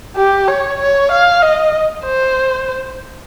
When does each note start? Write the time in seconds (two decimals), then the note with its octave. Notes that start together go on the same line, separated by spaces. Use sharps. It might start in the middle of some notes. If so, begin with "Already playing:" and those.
0.16 G4
0.48 C#5
0.79 C#5
1.11 F5
1.42 D#5
2.05 C5